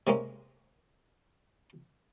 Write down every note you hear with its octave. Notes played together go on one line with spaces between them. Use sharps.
C3 G#3 A#3 C#4